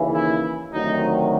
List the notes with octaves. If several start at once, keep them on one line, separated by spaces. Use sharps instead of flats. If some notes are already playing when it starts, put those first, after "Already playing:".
Already playing: D#2 C#3 E3
E4
D2 C3 D#3 F#3 D#4